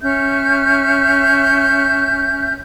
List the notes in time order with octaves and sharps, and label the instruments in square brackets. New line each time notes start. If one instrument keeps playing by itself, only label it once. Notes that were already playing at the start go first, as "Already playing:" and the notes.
[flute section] C#4 E5 F6 G6